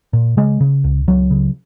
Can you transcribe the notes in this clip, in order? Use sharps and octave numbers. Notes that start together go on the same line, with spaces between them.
A#2
C#3 G#3
C#3
C#2
C#2 F#3
C#3